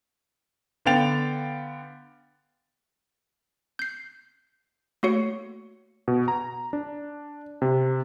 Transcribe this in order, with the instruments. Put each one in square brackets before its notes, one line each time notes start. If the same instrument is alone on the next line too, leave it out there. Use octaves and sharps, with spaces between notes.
[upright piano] D3 B3 F5 G5 A6 F7
[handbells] G6 C7
A3 A#3 F#4 C#5 C#7
[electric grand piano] B2
A#5
D4
C3